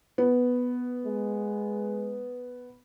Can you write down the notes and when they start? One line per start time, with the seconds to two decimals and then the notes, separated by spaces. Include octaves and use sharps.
0.18 B3
1.06 G#3